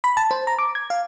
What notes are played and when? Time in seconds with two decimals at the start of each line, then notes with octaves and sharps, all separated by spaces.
0.04 B5
0.17 A5
0.31 C5
0.47 A#5
0.59 D6
0.75 G#6
0.90 F5